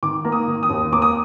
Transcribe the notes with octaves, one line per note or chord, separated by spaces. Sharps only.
D#3 D6
A#3
D#6
D#3
D#6
D#2
A#3 D6
D#6